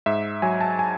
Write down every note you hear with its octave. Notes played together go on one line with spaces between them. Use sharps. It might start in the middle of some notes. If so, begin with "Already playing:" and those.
G#2 E5
F#3 G#5
A5
G#5